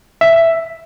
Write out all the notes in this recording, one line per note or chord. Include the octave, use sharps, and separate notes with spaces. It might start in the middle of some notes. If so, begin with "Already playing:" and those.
E5